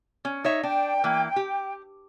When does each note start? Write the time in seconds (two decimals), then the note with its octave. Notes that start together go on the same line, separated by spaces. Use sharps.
0.25 C#4
0.44 D#4 C#5 E5
0.63 D4 G5
1.04 E3 A#3
1.36 G4